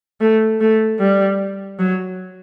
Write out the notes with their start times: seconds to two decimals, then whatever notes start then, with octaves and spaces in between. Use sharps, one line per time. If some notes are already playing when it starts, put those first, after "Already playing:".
0.21 A3
0.61 A3
0.99 G3
1.79 F#3